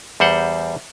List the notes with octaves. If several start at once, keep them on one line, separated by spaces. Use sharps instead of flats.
E2 G3 C5 F#5